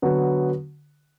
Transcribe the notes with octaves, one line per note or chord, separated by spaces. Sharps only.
D3 F#3 B3 F#4